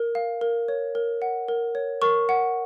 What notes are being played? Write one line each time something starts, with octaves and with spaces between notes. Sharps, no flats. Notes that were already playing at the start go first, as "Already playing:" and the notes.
Already playing: A#4
F5
A#4
C#5
A#4
F#5
A#4
C#5
A#4 C#6
F#5